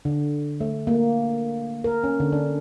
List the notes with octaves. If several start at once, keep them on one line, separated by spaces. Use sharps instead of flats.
D3
A3
A#3
A#4
C#4
D3
D4